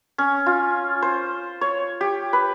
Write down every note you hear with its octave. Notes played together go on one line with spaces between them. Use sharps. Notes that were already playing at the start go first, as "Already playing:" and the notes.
C#4
F4
C5
C#5
G4
B4